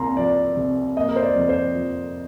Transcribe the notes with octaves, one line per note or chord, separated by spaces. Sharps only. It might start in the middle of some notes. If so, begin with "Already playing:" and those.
Already playing: C2 A#3 A#5 C6
F3 D5
C3
A#3 D#5
A#4
C5
D5
F2
C5
F3